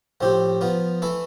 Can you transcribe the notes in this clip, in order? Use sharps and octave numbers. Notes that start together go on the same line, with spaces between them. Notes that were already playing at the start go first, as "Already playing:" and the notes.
A2 F3 C4 G4 C5
F3 B3 F4
E3 A3 E4 A4